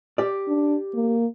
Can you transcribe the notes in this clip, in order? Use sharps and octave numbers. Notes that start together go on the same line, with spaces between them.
G4 D5
D4
A#3